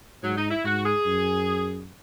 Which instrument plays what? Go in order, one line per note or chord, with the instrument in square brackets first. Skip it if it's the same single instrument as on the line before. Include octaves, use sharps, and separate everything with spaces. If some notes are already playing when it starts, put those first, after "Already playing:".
[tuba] G#2 [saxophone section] F#3
[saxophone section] D#4
E4
[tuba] G#2 [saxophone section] F#4
[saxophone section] G#4
[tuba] F#2